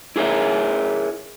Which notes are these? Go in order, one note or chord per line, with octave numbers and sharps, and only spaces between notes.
E4 G#4 A#4 C#5 E5